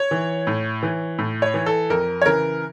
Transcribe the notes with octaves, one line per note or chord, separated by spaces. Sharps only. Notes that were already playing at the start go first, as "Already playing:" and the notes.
Already playing: C#5
E3
A2
E3
A2
C#5
E3
A4
F2 A#4
C#5
C#3 E3 A#4